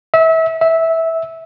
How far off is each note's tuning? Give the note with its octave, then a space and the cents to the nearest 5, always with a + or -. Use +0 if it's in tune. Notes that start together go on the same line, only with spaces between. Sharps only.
E5 -30
E5 -15